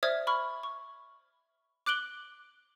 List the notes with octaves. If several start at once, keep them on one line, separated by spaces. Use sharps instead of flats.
C5 D5 E5 D#6 F6 G#6
B5 C#6 F6
C#6
D6 F#6 D7 F#7 G7